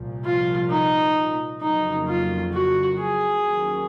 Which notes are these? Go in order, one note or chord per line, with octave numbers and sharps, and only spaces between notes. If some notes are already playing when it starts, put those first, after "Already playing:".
Already playing: C2 A#2 F3
F4
D#4
F2 C#3 F#3 A#3 D#4
F4
F#4
G#4
D#2 D#3 F#3 A#3 C#4